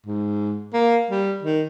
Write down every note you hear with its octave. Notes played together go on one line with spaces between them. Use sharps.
G#2
A#3
G3
D#3